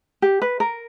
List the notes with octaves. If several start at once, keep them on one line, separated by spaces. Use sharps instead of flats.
G4
B4
A#4